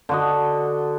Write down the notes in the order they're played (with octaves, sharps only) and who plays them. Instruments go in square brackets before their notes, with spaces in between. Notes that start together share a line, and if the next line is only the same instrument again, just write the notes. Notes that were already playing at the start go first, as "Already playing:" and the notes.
[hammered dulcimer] D3 F#4 D#5